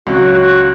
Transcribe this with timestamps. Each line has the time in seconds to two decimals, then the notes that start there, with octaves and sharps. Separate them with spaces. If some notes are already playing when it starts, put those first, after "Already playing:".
0.07 C#2 C#3 F#3 F#4
0.34 F#4